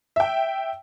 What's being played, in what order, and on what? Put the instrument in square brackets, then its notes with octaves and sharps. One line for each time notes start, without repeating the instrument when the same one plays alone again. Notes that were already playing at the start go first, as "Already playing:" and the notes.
[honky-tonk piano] E5 G5